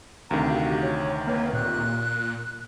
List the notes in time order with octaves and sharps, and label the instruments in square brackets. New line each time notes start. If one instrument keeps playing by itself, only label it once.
[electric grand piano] D2 C3 D#3 [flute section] F5 A#5
[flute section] F#4 G4 F5
C#5
[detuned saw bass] A#3 [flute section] B4 C#5
[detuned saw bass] A#2 [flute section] F#6